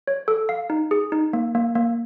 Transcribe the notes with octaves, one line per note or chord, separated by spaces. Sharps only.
C#5
A4
F5
D#4
G#4
D#4
A#3
A#3
A#3